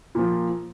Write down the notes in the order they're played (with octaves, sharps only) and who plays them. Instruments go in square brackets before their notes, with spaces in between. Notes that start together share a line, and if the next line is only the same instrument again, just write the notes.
[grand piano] A#2 F3